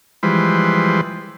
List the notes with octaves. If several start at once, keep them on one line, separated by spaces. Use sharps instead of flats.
E3 F3 G3 G#3 B4 C5